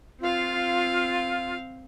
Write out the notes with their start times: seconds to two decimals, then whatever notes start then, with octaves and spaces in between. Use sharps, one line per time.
0.21 C4 F4 F5